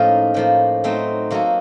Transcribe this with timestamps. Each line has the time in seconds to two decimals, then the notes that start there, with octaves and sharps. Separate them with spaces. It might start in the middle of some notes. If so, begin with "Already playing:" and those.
Already playing: A2 F3 A#3 C#4 D#4 A#4
0.34 A2 F3 A#3
0.84 F#3 A3 C4 D#4
1.31 F#3 A#3 D#4 F#4 A4